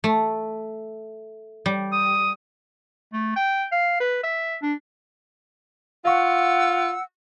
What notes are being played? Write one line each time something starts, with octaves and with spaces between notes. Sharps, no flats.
A3
G3
D#6
A3
G5
F5
B4
E5
D4
F4 F5 F#5 C#6 E6